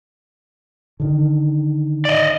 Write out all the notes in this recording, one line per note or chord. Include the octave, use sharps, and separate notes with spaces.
D3 D#3
D5 D#5